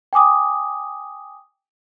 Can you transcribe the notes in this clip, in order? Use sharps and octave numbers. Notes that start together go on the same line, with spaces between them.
G5 G#5 D6 D#6